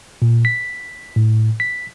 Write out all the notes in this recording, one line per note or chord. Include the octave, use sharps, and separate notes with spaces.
A#2
B6
A2
B6